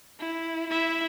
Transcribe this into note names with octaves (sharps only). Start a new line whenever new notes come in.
E4
E4 E5